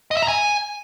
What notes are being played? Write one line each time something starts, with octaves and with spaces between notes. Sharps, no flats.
D#5
E5
A#5
G#5